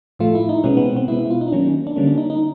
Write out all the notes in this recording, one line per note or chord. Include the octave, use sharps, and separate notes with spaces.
A2 F3 A3 F4
E4
D#4
B2 G#3 B3 C#4
B3
C4
C4
B2 G#3 B3 E4
E4
F4
D#4
D4
D#3 F#3 A#3 C#4
D4
D3 G3 A#3 C#4
D4
D#4
D#4